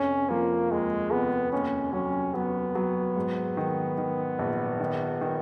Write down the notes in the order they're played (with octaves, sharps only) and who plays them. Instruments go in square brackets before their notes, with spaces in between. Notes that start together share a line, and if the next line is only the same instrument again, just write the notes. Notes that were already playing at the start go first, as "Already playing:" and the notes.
Already playing: [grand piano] F1 [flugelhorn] C#4
[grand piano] F3 [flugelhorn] A#3
[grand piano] D#2 [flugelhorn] G#3
[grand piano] F1 [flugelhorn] B3
[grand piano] D#2 [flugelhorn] C#4
[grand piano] F#3 [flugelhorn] C#4
[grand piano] F#3 [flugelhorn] B3
[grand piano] F#3
G#2
D#3
D#3
A#1
D#3
D#3